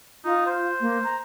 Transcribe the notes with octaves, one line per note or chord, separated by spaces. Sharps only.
D#4 F4
C5
A#3
A#5